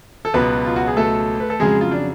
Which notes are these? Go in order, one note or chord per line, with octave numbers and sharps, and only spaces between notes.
A4
C#2 B2 F#3 B3 B4
F4
F#4
G#4
A3 A4
B4
A4
F2 C#3 F#3 G#3 G#4
F4
D4